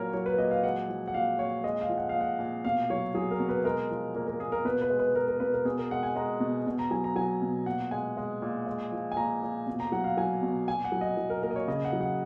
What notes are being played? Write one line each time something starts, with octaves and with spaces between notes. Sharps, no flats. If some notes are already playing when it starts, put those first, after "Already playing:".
Already playing: A#2 F#3 A#4 C#5
F#3 C#5
B4
A#2 D#5
F5
G#3 F#5
F3
F#5
A#2 F5
A#2 C#5
G#3 D#5
F5
F3
F#5
F5
A#2
F#5
A#2
B2 F5
F#3 C#5
F#3 G#4
A#4
B2
B4
G#3 A#4
F3
A#2 A#4
A#4
A#2 G#4
A#4
B2 B4
B4
G#3
B4
G#3 A#4
A#4
B2 B4
A#4
B2 G#4
A#4
G#3 F#5
G#5
G#3 A#5
B2
B2
A#5
F#3 G#5
A#5
F#3 G#5
B2
A#2 F#5
G#3 G#5
G#3
A#2
G#3
F3
G#5
A#2 A#5
A#2
B2
A#5
F#3 F#5
F5
F#3 G#5
B2
A#2 G#5
F#5
F#3
D#5
F#3
A#4
A#2 A#4
D#5
C#5
C#3 D#5
F#5
F#3
F#5